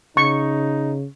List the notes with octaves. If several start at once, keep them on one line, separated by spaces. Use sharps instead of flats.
C#3 D#4 C#6